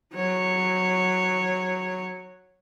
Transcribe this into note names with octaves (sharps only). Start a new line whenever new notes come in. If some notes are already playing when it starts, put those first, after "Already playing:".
F#3 C#5